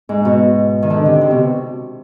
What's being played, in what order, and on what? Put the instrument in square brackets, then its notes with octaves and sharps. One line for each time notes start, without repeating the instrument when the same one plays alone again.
[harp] G#2
B2
D#3
D3
C3
C3
B2